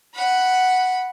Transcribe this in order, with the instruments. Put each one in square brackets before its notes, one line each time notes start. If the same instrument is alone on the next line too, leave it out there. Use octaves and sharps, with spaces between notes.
[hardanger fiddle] F#5 B5